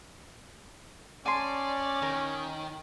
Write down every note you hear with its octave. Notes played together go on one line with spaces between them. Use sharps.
C#4 D5 G#5 A5 C6
D#3 A#4